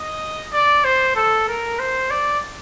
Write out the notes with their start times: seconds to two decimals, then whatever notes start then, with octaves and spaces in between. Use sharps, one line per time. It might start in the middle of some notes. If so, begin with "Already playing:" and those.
Already playing: D#5
0.53 D5
0.84 C5
1.16 A4
1.48 A#4
1.79 C5
2.10 D5